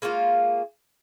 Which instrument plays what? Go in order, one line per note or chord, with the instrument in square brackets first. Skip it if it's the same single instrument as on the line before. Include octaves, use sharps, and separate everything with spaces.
[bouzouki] G#3 A#3 C#4 F4